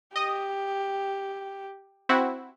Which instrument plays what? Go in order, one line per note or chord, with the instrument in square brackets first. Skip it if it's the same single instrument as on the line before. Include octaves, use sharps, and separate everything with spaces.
[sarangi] G4 [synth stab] D#5 D#6
[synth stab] C4 E4 F#4